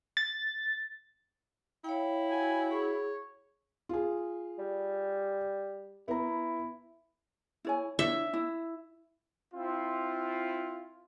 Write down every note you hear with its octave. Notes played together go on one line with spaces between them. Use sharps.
A6
E4 C#5 F5 G5
F#4 G#5
G#4 C#5
F4 G#4
G3
B3 E4 A#5
E4 C#5 G#5
D4 E4 C#5 E5
E4
C4 E4 F4